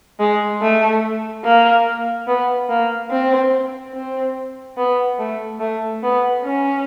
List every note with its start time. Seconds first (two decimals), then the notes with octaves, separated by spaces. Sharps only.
0.19 G#3
0.62 A3
1.44 A#3
2.27 B3
2.69 A#3
3.11 C4
3.94 C4
4.77 B3
5.19 A3
5.60 A3
6.03 B3
6.44 C#4